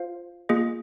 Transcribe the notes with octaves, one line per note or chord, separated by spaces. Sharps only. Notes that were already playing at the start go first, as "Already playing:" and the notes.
Already playing: F4 C5 F5
A#3 F4 G#4 D#5